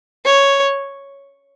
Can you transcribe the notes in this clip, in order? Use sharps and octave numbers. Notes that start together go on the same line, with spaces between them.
C#5